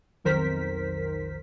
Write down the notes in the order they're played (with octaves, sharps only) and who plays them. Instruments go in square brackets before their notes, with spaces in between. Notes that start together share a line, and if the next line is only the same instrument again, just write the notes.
[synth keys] B1 F2 D#3 A#4 C5 B6